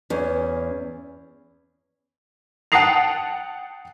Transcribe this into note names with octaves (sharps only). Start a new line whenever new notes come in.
E2 C#4
F#5 G5 A5 D#6 C7 F7